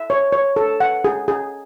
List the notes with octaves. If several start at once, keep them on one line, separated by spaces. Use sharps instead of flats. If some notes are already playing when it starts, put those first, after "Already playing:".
Already playing: E5
C#5
C#5
A4
F#5
G#4
G#4